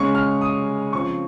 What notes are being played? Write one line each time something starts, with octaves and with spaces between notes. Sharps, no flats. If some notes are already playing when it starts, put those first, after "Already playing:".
Already playing: C#3 G#3 C#4 C#6
F6
D#6
C#3 F3 C4 C#6